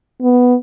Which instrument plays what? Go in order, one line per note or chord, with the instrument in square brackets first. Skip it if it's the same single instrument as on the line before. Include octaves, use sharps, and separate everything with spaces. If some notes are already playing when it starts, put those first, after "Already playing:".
[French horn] B3